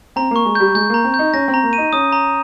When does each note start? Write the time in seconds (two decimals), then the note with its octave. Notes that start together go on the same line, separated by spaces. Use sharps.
0.16 C4 A#5
0.31 A#3 C#6
0.45 G#3
0.55 G3 G6
0.75 G#3 G6
0.90 A#3 A#5
1.04 C4
1.14 G6
1.19 D#4
1.34 C#4 A#6
1.48 C4
1.54 A#5
1.63 A#3
1.73 D#7
1.78 D#4
1.93 C#4 D#6
2.12 A#5